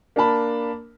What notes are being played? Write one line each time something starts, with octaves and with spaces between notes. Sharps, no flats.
A#3 D4 A#4 A5 B5